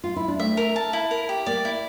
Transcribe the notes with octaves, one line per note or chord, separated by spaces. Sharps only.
F4
E4
D4
A3 C4 E5
A#4
A5
E4
A#4
G4
A#3 D5
E4